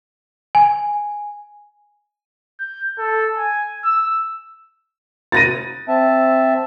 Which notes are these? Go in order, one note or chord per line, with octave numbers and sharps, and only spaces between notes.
G#5
G6
A4
G#5
E6
A6 A#6 D#7
C4 E5 A5